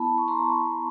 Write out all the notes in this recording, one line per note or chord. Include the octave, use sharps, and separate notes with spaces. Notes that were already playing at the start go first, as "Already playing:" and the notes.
Already playing: B3 E4 A5 B5
C#6
A#5 C6